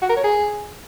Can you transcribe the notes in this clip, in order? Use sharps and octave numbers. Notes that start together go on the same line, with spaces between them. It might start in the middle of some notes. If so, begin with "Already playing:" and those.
F#4
A#4
C#5
G#4